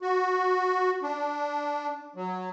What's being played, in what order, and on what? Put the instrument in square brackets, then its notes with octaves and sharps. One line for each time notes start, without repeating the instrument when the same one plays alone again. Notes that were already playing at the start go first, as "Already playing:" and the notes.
[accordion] F#4
D4
F#3